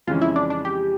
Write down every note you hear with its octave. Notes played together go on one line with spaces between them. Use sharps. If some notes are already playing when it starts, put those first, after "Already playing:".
F2 C#3 E3 G#3 C#4 F4
E4
D4
D4
G4